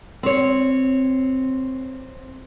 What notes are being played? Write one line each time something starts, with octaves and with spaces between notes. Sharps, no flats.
C4 C#5